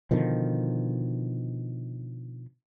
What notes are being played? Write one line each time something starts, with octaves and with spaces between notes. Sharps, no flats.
B2 D3 D#3 F3